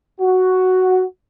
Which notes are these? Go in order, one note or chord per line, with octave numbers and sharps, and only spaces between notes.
F#4